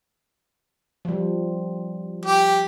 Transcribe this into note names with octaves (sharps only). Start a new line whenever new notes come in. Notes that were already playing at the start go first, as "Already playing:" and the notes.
F3 G3
G4